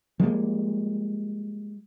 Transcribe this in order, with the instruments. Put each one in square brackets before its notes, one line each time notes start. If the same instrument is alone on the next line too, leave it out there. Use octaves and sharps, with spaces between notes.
[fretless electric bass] F3 G3 G#3 A#3